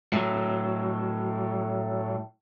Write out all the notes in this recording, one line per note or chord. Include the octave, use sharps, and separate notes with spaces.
A2 F#3